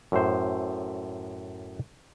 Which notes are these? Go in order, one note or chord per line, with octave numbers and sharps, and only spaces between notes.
F#2 A2 C5